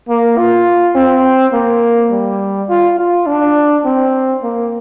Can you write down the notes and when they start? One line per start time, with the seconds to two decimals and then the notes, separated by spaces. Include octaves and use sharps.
0.09 A#3
0.38 F4
0.95 C4
1.53 A#3
2.11 G3
2.69 F4
2.99 F4
3.27 D4
3.85 C4
4.43 A#3